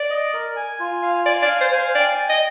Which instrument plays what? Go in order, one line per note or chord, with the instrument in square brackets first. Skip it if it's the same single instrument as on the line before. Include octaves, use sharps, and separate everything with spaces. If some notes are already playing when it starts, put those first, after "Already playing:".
Already playing: [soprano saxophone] D5
[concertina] D#5
A#4
G#5
F4
F5
[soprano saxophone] D5 [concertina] G#5
[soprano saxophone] D5
[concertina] F5
[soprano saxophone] C5
[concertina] G#5
[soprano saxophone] C5
[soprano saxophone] D5 [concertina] G5
[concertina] G5
[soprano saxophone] D#5